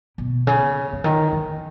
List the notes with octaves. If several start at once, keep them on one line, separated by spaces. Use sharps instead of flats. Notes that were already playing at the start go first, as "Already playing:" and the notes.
B2
C#3
C#3
D#3
D#3